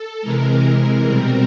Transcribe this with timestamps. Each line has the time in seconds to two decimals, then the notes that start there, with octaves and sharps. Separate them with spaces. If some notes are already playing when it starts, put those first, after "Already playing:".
Already playing: A4
0.22 C3 E3 G#3 A#4
1.05 B2 G3 C4